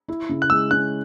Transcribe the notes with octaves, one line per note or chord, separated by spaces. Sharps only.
E4
C#3
F#6
G#3 E6
C#4 F#6